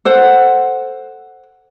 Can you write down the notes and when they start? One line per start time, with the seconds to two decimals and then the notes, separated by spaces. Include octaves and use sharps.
0.05 A4 C5 F#5